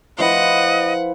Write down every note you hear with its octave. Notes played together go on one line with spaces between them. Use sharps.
F3 E4 B4 D#5 F#5